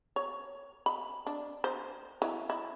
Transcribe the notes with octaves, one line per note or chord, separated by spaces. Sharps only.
C#5
B5
D4
C5
E3
E4